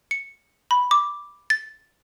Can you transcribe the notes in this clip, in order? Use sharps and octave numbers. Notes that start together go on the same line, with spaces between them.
C#7
B5
D6
A6